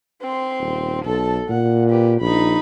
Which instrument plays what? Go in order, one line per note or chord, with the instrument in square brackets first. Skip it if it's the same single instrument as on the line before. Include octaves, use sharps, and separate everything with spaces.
[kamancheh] C4 C6
[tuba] D#1
[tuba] B1 [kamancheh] A4 A5
[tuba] A#2 [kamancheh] F#5
[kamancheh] G4 B4
[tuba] A#1 [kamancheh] D#4 B5